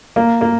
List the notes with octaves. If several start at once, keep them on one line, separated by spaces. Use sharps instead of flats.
A#3
A#3